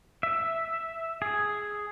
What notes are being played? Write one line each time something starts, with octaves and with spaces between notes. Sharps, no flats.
E5
G#4